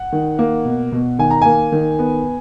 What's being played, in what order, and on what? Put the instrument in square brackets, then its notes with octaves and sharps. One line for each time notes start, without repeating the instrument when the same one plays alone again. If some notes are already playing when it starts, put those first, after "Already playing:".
Already playing: [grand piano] F#5
D#3
A#3
B2
B2
D#3 G#5
A#5
A#3 G#5
D#3
B3